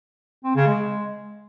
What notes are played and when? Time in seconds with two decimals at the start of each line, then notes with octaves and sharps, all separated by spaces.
0.44 C4
0.55 C#3
0.67 G#3